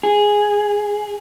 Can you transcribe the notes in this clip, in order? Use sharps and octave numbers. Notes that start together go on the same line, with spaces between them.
G#4